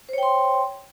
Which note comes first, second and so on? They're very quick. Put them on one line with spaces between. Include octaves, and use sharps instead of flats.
C5 C#5 G5 C6